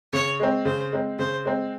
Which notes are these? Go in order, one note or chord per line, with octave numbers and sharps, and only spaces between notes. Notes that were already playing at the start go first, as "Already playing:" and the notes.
C#3 C#5
G#3 C4
C#3 C5
G#3 C4
C#3 C5
G#3 C4